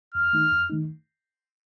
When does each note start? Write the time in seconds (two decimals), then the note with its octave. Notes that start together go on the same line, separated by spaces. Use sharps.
0.14 F2 F6
0.33 D#3 A3 D#4
0.51 F2
0.70 D#3 A3 D#4